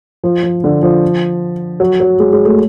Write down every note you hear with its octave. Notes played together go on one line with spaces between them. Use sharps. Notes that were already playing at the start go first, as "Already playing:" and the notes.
F3
F3
D3
F3
F#3
F#3
G#3
G#3
A3